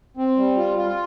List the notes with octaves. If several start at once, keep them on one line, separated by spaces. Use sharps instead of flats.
C4
G3
F4
F4